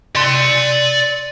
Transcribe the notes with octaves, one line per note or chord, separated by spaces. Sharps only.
D5 C6